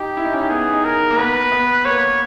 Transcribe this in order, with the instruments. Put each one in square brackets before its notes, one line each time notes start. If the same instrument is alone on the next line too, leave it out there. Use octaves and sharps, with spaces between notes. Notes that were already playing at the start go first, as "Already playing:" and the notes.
Already playing: [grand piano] D#4 [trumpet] G4
[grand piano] E4
D#4
C#4
D#4
[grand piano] B3 [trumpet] G#4
[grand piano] D#4
[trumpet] A#4
[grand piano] A#3
[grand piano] B3 [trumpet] B4
[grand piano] B3
[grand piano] A#3 [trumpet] C#5